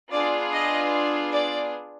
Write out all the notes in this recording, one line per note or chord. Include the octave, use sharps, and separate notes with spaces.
B3 D4 F4 G#4 D5
D#5
D5